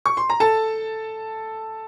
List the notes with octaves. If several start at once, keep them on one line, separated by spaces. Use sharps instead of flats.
C#6
C6
A#5
A4 A5